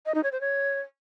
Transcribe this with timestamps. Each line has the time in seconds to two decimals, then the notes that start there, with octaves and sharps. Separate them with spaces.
0.06 D#5
0.15 D#4
0.23 C#5
0.32 C5
0.41 C#5